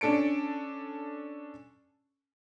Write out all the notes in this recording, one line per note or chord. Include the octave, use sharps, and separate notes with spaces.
C#4 D4 A4 C#7 D7